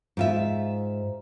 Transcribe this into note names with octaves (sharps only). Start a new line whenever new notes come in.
G#2 F4 E5